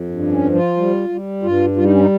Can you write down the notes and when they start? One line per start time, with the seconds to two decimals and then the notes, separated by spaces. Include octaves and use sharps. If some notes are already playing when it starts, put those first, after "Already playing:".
Already playing: F2
0.09 G2
0.32 C#4
0.43 F3
0.55 F4
0.77 G3
1.09 G3
1.42 G2 F4
1.76 G3 F4
1.84 D#4
1.93 C#4
2.00 D#4